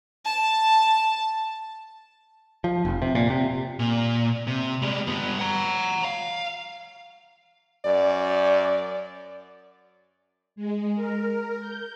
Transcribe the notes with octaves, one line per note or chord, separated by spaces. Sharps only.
A5
F3
F1
C3
A#2
C3
A#2
C3
G3 G#3
G2 B3
F#5 A#5
F5
F#2 D5
G#3
A#4
G6